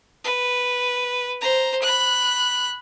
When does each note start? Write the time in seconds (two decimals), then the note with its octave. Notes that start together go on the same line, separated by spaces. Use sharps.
0.25 B4
1.41 C5 A#5
1.82 B5 F#6